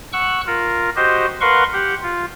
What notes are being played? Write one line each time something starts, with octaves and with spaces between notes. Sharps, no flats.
F#5 C#6 E6 F#6
F4 A#4
F#4 G4 C5 D#5
A#4 B4 F5 F#5 C6 C#6
G4 F#5
F4